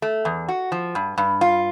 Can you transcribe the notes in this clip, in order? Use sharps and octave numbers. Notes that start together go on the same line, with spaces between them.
A3
E2
F#4
F3
G2
G2
F4